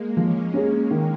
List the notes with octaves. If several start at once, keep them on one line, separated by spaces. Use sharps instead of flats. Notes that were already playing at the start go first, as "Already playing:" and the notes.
Already playing: G#3 A#3
F3 C#4
A#3 C#4 G#4
D#3